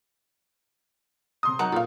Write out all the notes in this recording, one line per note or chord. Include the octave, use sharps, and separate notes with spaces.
C3 C6 D#6
F#3 D#4 A#4 F#5 A5 A#5 C#6
A#2 A4 F5